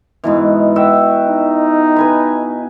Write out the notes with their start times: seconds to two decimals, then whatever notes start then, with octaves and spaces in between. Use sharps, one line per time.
0.24 G#2 B2 E3
0.76 F#4 E5 G5
1.29 D#4
1.96 B4 G#5 B5